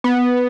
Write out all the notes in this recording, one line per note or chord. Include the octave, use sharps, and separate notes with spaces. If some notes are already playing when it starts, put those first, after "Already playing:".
B3